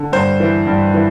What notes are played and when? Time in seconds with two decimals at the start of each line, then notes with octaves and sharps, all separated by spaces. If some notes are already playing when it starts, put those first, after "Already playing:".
Already playing: D3
0.12 G2 C5
0.40 E3
0.67 G2
0.94 E3